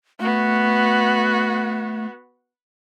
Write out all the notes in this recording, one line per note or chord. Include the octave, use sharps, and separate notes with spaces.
A3 B3 F#4